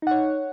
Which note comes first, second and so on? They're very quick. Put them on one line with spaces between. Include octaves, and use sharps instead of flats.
D#4 F#5 C#5